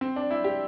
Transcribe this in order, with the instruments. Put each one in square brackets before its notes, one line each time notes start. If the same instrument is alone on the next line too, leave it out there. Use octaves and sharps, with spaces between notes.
[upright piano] C4
D4
E4
G4